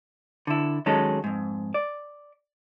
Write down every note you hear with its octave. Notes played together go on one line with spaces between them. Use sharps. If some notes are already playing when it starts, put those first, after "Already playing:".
D3 E4
D#3 F#3 G#3 C#4 A4
F2 G#2
D5